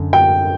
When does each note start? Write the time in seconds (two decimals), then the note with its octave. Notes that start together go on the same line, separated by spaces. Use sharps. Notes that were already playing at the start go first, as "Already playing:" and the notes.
Already playing: F#2 D3
0.13 G5